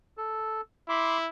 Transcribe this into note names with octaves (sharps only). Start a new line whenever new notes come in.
A4
E4 B5 C6 D6